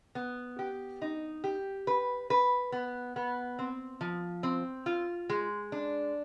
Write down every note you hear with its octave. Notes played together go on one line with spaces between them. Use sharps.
B3
G4
D#4
G4
B4
B4
B3
B3
C4
F3
C4
F4
G#3
D4